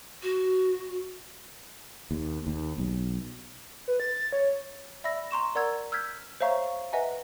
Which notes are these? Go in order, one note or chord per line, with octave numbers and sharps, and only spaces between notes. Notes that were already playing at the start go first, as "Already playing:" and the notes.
F#4
D#2
D#2
B1
B4
A6
C#5
D5 E5 B5 E6 A#6
A#5 C6 C#6 E7
A#4 D5 F#5 A#5 E6 G#6
E6 F6 G6 G#6 B6
C5 C#5 E5 F5 A#5 C#6
B4 D#5 E5 F#5 G#5 A#5